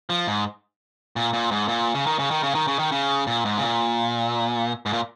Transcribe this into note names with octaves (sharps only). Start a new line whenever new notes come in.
F3
G#2
A#2
A#2
G#2
A#2
C#3
D#3
C#3
D#3
C#3
D#3
C#3
D#3
C#3
A#2
G#2
C#3
A#2
G#2
A#2